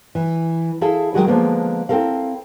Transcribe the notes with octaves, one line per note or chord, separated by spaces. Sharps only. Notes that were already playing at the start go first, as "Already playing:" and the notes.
E3
E4 G#4 A4 F5
D#3 E3 F#3 G#3 F#4 G#4
D3 F3 G#3 A#3 B3
C4 E4 A4 A#4 F5